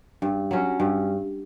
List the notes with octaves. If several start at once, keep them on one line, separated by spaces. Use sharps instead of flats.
G2
F#3 C#4
G2